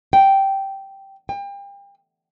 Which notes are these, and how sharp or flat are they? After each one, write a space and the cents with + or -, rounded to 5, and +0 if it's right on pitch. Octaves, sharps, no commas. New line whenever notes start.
G5 -10
G5 +35